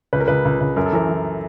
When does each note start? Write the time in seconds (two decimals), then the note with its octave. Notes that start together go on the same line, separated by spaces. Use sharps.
0.13 C#2 B4
0.20 A#4
0.28 C#2 B4
0.45 C#2
0.61 C#2
0.76 F#2 A#4
0.86 A4
0.92 E3 A#4
1.09 E3